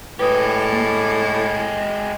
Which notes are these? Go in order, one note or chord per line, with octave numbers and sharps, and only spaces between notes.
A2 G#3 G4 B4 D#6
A#3